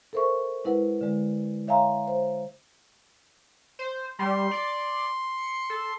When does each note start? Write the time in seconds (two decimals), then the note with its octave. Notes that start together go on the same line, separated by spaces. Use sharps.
0.13 A4 A#4 C5 E5 C#6
0.64 G#3 E4 B4 F#5
1.01 D3 G#3
1.67 C#5 E5 F5 G#5 A#5 C6
2.08 C5
3.79 C5
4.19 G3 C6
4.51 D5
5.38 C#7
5.70 A4